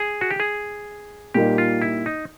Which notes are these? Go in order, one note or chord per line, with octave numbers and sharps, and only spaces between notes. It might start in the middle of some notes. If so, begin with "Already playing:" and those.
Already playing: G#4
F#4
G4
G#4
A#2 G3 A#3 D#4 G4
F4
E4
D#4